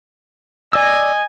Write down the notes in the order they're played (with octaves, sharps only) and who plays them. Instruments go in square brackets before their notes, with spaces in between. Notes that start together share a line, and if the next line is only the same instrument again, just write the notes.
[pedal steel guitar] D5 E6 [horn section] D#5 G#5